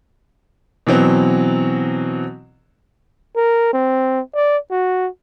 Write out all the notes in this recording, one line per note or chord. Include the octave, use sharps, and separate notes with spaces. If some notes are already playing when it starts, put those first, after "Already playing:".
B2 E3 F#3 C4
A#4
C4
D5
F#4